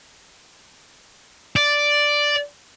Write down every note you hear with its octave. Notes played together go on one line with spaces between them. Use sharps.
D5